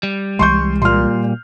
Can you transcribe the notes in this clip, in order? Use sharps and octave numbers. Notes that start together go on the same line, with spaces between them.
G3
C2 E3 G#3 C6 C#6 G6
A#2 C6 F6